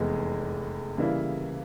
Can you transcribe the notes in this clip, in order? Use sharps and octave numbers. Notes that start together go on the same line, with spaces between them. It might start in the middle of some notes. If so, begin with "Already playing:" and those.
Already playing: F1 E2 E3 G#3
C#3 E3 G3 A#3 E4